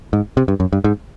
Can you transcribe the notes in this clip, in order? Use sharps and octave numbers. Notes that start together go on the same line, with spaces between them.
G#2
C3
G2
F#2
G2
G#2